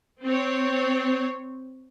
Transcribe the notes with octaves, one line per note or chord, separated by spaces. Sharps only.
C4 C#5